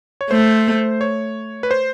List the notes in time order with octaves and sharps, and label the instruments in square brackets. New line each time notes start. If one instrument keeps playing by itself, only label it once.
[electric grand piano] C#5
[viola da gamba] A3 [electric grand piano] C5
[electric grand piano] C#5
B4
C5